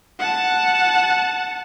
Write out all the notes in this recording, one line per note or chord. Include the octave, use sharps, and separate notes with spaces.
F#5 A5